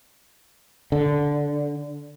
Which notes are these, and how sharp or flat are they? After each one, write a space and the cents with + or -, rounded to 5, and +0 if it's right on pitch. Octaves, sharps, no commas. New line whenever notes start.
D3 -10